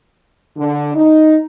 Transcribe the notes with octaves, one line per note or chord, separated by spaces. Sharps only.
D3
D#4